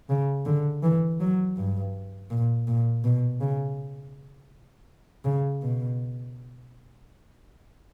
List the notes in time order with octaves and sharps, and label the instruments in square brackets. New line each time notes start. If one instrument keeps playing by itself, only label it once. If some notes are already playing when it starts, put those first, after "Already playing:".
[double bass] C#3
D3
E3
F#3
G2
A#2
A#2
B2
C#3
C#3
B2